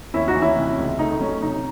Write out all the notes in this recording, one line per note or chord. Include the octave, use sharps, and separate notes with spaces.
D#2 C#4 E4
D#4 F#4
E3
C#4 E4
C3
C#2
A3 D#4
F#3 C#4
C3 D#4